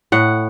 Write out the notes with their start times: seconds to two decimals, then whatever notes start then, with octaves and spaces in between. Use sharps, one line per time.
0.12 A2 F#5